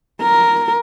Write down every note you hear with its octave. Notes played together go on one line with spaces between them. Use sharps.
A#4